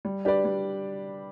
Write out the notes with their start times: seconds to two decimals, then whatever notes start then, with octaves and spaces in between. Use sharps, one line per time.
0.05 G3
0.25 D4 G4 B4 D5
0.45 G3